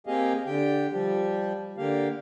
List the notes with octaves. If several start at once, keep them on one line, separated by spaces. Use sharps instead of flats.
A#3 C4 G4 G#4 D#5 F5
D3 G4 G5
F3 G3 G4
D3 A#3 G4 F5